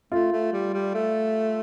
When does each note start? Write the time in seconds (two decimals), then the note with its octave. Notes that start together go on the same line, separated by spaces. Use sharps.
0.12 A3 F4
0.32 A3
0.53 G3
0.74 G3
0.94 A3